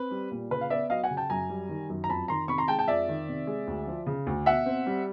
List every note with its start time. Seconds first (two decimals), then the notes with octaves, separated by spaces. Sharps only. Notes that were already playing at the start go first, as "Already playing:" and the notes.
Already playing: C4 B4
0.11 G3
0.31 A#2
0.50 C#3 B4
0.61 F5
0.70 B3 D5 E5
0.90 F#3 D#5 F5
1.04 F#5 G#5
1.11 C#3
1.17 G5 A5
1.30 F#2 G#5 A#5
1.50 G3
1.69 D#3
1.90 F#2
2.04 A#5
2.09 F2 A5 B5
2.28 D#3 A#5 C6
2.48 C3 B5 C#6
2.58 A#5 C6
2.68 G#3 G5 A5
2.79 G5 A5
2.88 F2 D5 E5
3.08 D#3
3.29 C3
3.47 G#3
3.67 D2
3.87 F3
4.07 C#3
4.27 D2
4.46 B2 E5 F#5
4.66 C4
4.87 G3